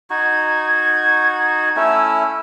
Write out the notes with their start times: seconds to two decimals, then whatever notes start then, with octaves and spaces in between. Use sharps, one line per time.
0.10 D#4 F#4 G#6
1.76 A3 C#4 E4 E6